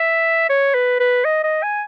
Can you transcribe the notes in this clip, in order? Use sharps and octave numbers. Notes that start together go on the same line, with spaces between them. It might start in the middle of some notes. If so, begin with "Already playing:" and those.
Already playing: E5
C#5
B4
B4
D#5
D#5
G#5